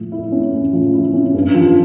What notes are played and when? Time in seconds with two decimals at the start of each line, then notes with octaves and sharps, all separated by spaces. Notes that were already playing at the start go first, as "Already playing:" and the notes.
Already playing: A2 F3
0.12 E4
0.32 C#4
0.53 A2
0.73 F3
0.93 E4
1.14 C#4
1.34 G2
1.55 F3